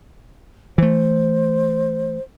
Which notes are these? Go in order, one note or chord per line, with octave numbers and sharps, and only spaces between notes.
E3 A3 C5